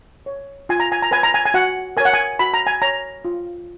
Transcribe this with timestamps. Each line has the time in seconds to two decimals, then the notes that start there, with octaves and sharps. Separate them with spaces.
0.26 C#5
0.69 F4 G#5
0.80 A#5
0.92 G#5
1.02 A#5
1.11 B4 G#5
1.23 A#5
1.34 G#5
1.45 G#5
1.54 F#4 F#5
1.97 A#4 C#5 G#5
2.05 F#5
2.13 G#5
2.39 F#4 B5
2.54 A#5
2.67 G#5
2.82 C#5 A#5
3.25 F4